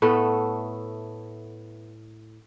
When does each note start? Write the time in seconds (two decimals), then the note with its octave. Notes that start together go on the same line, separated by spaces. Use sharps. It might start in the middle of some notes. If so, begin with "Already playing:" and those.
0.02 A2 A3 B3 A4